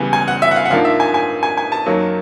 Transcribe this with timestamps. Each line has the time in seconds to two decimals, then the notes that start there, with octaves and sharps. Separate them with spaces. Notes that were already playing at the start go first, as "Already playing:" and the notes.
Already playing: C#2 C#3 E3 G3 B3 G#5
0.13 G#5
0.28 F#5
0.42 E5
0.51 F#5
0.56 F5
0.66 F#5
0.71 G#2 F3 A#3 D4 F5
0.85 E5
1.00 G#5
1.14 G#5
1.43 G#5
1.57 G#5
1.72 A5
1.86 F#2 D#3 F#3 A#3